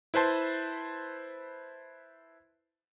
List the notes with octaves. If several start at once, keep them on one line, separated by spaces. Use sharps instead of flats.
E4 B4 C5 A5 C6